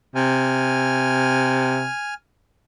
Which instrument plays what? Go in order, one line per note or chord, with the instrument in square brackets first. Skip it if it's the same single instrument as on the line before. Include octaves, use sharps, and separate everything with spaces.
[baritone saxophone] C3 [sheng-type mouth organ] G#5 F6